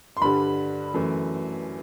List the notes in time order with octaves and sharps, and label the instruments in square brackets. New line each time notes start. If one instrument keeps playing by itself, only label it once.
[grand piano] C6
G2 D3 G3 B5
F#2 E3 A3